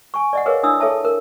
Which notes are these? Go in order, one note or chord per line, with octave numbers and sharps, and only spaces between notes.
G#5 C#6
D5 D#5 F#5
G#4 A#4 B4 C#5 D#5 F5
D4 E4 D#6 E6
G#4 A4 C#5 E5 A5
A#4